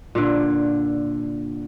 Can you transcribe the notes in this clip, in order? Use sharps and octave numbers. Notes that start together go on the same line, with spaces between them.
A#2 D3